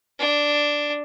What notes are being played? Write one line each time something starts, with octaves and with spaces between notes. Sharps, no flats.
D4